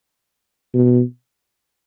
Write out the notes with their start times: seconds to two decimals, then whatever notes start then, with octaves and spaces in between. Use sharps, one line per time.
0.74 B2